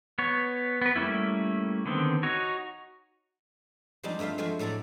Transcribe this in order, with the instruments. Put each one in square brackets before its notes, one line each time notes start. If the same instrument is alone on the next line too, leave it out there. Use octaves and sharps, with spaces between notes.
[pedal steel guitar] B3 C#5
B3 B4
G3 A3 A#3 C#4 E4
D3 D#3 B3 C4
D#4 F#4 C#5
[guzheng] F3 G3 G#3 C4 D4 D#4
G2 A3 F4 E5 F5
F3 G#3 A3 F4 F#4
A2 F#3 A4 D5 A#5